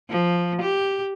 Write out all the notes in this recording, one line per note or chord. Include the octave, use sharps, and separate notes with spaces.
F3
G4